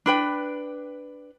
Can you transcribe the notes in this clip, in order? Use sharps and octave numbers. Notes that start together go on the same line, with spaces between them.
D4 B4 G5